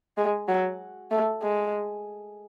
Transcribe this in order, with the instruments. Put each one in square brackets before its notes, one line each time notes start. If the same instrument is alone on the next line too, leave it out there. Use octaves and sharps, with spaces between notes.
[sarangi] G#3
F#3
A3
G#3